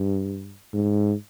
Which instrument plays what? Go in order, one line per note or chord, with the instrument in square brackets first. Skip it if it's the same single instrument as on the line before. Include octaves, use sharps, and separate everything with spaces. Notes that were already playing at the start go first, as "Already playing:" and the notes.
Already playing: [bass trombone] G2
G#2